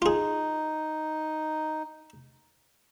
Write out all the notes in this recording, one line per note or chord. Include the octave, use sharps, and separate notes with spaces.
D#4 F4 G#4